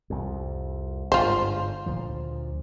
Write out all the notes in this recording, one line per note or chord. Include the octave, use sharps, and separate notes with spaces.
C2 F2
G1 G#2 F4 C5
D2 A#2 F3